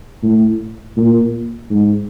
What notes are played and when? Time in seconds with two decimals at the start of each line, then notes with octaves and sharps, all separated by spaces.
0.23 A2
0.97 A#2
1.70 G#2